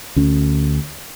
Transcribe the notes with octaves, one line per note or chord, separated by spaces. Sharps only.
D2 C#4